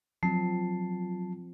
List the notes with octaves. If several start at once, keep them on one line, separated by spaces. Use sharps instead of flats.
F3 F#3 C4 A5 C7